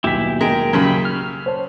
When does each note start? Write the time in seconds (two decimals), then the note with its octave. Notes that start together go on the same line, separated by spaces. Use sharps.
0.04 D#1 B1 E4 G4 B6
0.41 G#3 A#4 G5
0.73 F#2 C#3 G4 B5
1.05 F6
1.46 C5 C#5 A5